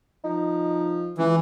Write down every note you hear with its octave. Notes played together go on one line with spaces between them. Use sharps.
F3 D#4
C#2 E3